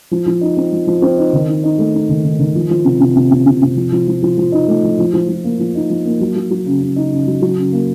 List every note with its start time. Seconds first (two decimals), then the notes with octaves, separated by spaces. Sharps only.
0.11 F3
0.26 F3
0.41 D#4
0.57 C4
0.72 F3
0.87 F3
1.02 C4
1.18 D#4
1.33 D#3
1.48 D#4
1.64 D#4
1.78 A3
1.94 D#4
2.09 D#3
2.24 D#3
2.39 D#3
2.55 F3
2.70 F3
2.85 C3
3.00 C3
3.16 C3
3.31 C3
3.46 C3
3.62 C3
3.76 F3
3.92 F3
4.08 F3
4.22 F3
4.38 F3
4.52 D#4
4.68 A3
4.83 F3
4.99 F3
5.13 F3
5.28 F3
5.44 A#3
5.59 F3
5.75 D#4
5.90 F3
6.05 A#3
6.21 F#3
6.36 F#3
6.51 F#3
6.66 C#3
6.81 C#3
6.96 D#4
7.11 C#3
7.27 F#3
7.42 F#3
7.57 C#3
7.73 A#3